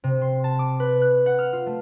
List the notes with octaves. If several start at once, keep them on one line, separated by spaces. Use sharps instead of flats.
C3
C6
A5
D6
B4
F#6
F#5
F6
F4
A3